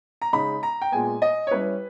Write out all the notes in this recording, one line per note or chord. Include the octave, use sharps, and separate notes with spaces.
A#5
C#3 G#3 D#4 B5
A#5
G5
A#2 G#3 B3 G#5
D#5
C#5
G3 C#4 E4 B4